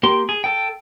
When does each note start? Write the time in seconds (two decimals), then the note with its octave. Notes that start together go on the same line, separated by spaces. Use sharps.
0.03 A#3 G4 C6
0.29 G#4
0.44 A4 G5